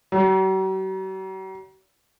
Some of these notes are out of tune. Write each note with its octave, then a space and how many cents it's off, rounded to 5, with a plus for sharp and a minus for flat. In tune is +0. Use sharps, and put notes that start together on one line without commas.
F#3 +45